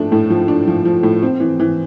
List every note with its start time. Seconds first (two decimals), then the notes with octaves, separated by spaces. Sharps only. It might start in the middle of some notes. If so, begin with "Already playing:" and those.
Already playing: A2 F3 A3 D4
0.12 A2
0.30 F3
0.48 D4
0.67 F3
0.85 F3
1.03 A2
1.22 C4
1.40 E3
1.59 E3